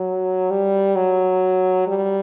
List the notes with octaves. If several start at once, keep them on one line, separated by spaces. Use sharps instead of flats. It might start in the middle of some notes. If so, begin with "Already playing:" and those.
Already playing: F#3
G3
F#3
G3